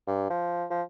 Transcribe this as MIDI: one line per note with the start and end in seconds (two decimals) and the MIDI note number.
0.07 0.26 43
0.30 0.65 53
0.70 0.83 53